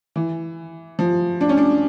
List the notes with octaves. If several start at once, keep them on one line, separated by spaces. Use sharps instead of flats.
E3
F3
D4
C#4
D4